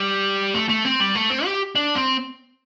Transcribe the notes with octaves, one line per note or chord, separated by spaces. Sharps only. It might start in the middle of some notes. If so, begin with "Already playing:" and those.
Already playing: G3
A3
A3
C4
G3
A3
C4
G4
D4
C4